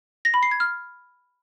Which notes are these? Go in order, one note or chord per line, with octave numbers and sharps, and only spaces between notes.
A#6
B5
C7
G#6
F6